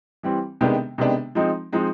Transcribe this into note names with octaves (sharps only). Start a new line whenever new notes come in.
E3 G3 C4
C3 D#3 G#3 B3 D4
C3 D#3 G#3 B3 D4
F3 G#3 C4 D#4
F3 G#3 C4 D#4